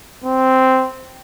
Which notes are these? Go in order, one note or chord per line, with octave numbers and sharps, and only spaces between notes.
C4